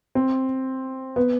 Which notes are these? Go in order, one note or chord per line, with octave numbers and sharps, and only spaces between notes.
C4
B3